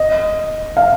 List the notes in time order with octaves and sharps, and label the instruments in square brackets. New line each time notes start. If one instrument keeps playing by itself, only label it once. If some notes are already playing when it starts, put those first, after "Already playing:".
Already playing: [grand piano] D#5
F5